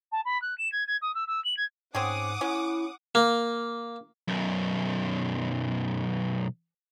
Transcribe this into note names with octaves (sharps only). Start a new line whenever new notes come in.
A5
B5
F#6
E7
G#6
G#6
D#6
E6
E6
F#7
G#6
G#2 C4 C#4 G#4 F#5 D6 D#6
C#4 E4
A#3
B1 F#2